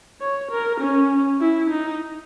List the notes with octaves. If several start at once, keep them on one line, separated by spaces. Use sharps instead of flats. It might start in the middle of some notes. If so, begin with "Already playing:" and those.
C#5
A#4
C#4
E4
D#4